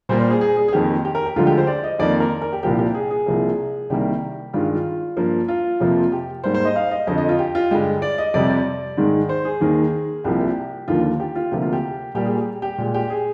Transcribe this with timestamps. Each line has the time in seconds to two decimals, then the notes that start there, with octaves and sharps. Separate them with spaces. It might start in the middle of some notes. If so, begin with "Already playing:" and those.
0.09 A#2 G3 A#3 C5
0.20 C5
0.30 G#4
0.41 G#4
0.57 G#4
0.68 G#4
0.73 F2 D#3 A#3 G4
1.05 G4
1.15 A#4
1.26 G4
1.36 D2 D3 F3 G#3 F4
1.47 G4
1.58 C5
1.67 D5
1.84 D#5
1.99 F2 D#3 A#3 D5
2.20 A#4
2.42 A#4
2.53 G4
2.63 C2 A#2 F3 A#3 G4
2.79 G4
2.95 G#4
3.11 G#4
3.26 C2 C3 F3 A#3
3.90 C2 C3 D#3 G3 A#3 G4
4.53 G2 D#3 G#3 F4
4.75 F4
5.17 G2 F3 A#3
5.48 F4
5.80 F2 C3 F3 A#3
6.12 G4
6.44 G#2 G3 A#3 C5
6.54 C5
6.65 D#5
6.76 F5
6.91 D#5
7.07 F2 D3 F3 D#5
7.18 D#5
7.29 F4
7.39 G4
7.55 F4
7.71 G2 D3 G#3 G4
8.02 D5
8.18 D#5
8.34 F2 C3 G3 D5
8.50 D5
8.97 G#2 D#3 G#3
9.29 C5
9.45 G#4
9.61 D#2 D#3 A#3
10.24 C2 C3 F3 A#3 G4
10.40 G4
10.88 D#2 D3 F3 A#3 F4
11.04 F4
11.20 G4
11.35 F4
11.51 D2 C3 F3 A#3 G4
11.62 F4
11.72 G4
12.15 A#2 G3 A#3 G4
12.25 G#4
12.36 G4
12.62 G4
12.78 A#2 G#3
12.94 G4
13.10 G#4